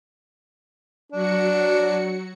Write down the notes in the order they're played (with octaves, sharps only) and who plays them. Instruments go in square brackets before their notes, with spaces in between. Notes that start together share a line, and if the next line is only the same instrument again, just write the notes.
[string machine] F#3 F#4 C#7 [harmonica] D4